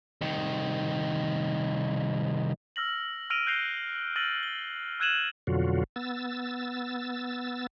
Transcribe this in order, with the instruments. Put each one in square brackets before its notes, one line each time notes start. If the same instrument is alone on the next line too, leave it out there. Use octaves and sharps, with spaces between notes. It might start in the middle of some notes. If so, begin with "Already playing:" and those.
[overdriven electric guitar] C2 D#3
[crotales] E6 F6 A#6 F#7
E6 F6 A#6 D7 D#7 F7
F#6 G6 A#6 C7 F7 G7
E6 F6 A6 A#6 D#7 F#7
G7
E6 F#6 G#6 D#7 E7 F#7
[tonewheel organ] F2 B2 D3 F#3 F4 F#4
B3 E6 A6